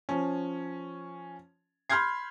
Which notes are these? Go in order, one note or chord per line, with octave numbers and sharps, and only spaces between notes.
F3 C#4
B5 C6 F6 G6 G#6 C7